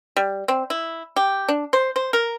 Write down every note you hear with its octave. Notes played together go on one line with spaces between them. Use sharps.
G3
C4
E4
G4
D4
C5
C5
A#4